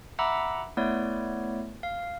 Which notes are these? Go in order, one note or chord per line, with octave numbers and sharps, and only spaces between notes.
E5 F#5 A#5 B5 D6 E6
A3 B3 E4 C#5 D5
F5